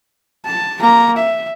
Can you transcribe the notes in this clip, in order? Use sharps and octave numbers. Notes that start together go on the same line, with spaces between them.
A5
A#3 A#5
E5